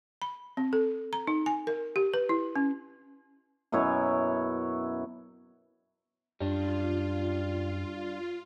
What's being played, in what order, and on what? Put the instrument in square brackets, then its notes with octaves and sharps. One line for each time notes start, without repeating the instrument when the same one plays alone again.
[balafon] B5
C4
A4
A#5
D#4
G#5
A#4
G4
B4
E4
C#4
[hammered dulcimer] F#2 B2 E4 C#5
[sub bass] F#2 [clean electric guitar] G3 D4 [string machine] F4